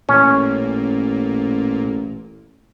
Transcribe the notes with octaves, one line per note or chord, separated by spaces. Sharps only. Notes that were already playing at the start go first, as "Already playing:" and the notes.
A1 A#2 C#4